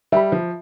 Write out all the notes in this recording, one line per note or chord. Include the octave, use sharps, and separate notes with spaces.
G3 E5 B5
F3